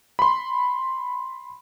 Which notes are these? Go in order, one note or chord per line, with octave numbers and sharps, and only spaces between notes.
B5 C6